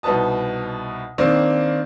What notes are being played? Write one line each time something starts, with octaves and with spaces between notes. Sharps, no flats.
C2 B2 D#4 B4 A5 D#6
D#3 A#3 C4 D4